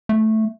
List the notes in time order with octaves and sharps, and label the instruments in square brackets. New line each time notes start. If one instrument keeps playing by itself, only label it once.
[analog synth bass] A3